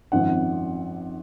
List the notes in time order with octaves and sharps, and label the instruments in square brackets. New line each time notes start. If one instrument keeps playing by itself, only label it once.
[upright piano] G#1 F#2 F3 C4 F#5